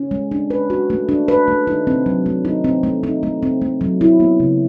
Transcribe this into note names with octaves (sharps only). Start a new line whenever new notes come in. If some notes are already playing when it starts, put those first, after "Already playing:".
Already playing: C#4
G#3
D4
B4
F#4
A3
D4
B4
A3
D#4
C4
F#3
A3
D#4
C4
A3
D#4
A3
C4
A3
F#3
E4
B3
C#3